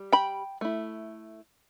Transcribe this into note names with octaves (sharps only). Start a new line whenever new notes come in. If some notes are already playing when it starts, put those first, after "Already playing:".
Already playing: G3
G5 B5
A3 E4